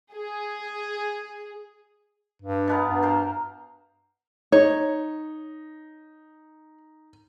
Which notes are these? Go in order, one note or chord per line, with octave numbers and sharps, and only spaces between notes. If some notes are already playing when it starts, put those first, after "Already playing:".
G#4
G2
B2 B3 A#4
G2
A#4 C5
D#4 C#5